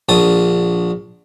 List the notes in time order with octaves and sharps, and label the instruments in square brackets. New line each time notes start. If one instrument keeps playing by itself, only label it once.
[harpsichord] A#1 D3 A5 D#6